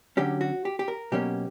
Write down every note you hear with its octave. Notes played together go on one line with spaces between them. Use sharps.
D3 F#3 C#4 G4
F#4
G4
G4
A#4
B2 F#3 A#3 C#4 G4